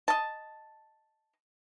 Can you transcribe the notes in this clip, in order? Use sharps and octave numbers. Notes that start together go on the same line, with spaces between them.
D#5 A5